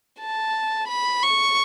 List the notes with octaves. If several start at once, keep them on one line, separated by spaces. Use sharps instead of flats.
A5
B5
C#6